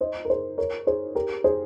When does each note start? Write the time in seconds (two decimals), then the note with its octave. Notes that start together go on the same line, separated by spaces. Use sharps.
0.01 C5 D#5
0.25 A#4
0.30 G#4 C5
0.58 A#4 C#5
0.87 G#4 C5
1.15 G4 A#4
1.44 G#4 C5